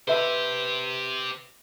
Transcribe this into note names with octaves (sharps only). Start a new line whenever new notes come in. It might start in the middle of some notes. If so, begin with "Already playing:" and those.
G4 B4 C5 E5